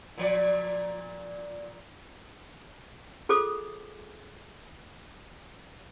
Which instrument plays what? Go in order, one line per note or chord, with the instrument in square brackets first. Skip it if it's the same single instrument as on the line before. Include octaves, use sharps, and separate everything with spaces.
[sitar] A#2 F3 D5
[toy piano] F4 G#4 A4 C5 D6 D#6